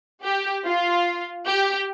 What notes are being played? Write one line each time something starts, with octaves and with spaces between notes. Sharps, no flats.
G4
F4
G4